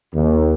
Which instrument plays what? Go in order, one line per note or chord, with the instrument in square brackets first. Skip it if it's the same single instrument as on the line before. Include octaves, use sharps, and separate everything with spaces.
[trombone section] D#2